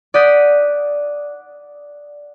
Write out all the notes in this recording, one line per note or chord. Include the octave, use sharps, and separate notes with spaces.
D5 F#5 D#6 G6 B6